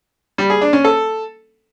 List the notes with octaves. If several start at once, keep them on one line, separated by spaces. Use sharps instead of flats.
G3
G#4
D4
C#4
A4